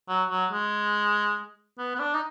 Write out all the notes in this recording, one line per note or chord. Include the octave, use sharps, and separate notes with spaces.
F#3
F#3
G#3
B3
B3
D4
D#4